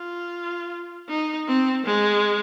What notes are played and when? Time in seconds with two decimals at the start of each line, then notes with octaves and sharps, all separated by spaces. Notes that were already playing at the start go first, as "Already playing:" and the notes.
Already playing: F4
1.09 D#4
1.47 C4
1.86 G#3